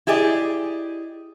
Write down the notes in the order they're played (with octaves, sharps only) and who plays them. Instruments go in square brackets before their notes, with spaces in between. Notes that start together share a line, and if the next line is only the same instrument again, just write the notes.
[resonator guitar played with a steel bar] E4 G4 G#4 D5 D#5